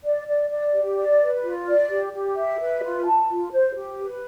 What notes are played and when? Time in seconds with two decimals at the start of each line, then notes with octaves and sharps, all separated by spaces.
0.03 D5
0.27 D5
0.50 D5
0.73 G4
0.96 D5
1.20 B4
1.43 F4
1.67 D5
1.90 G4
2.12 G4
2.36 E5
2.59 B4
2.83 F4
3.06 A5
3.29 F4
3.52 C5
3.75 G4
3.98 B4